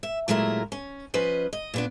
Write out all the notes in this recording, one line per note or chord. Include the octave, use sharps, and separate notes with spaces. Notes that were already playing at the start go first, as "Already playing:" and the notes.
E5
A#2 F#3 G#3 A3 E4 A#4
C#4
F3 C#4 B4 C5 D#5
D#5
A#2 B3 D4